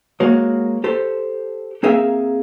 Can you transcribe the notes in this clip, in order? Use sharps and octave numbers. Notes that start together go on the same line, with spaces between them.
G#3 A#3 F#4 C#5
G4 A4 C5
A#3 C4 G#4 A#4 E5 F5